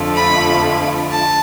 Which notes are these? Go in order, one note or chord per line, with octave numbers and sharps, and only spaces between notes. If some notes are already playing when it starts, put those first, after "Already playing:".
Already playing: F2 D3 F3 A3
B5
A5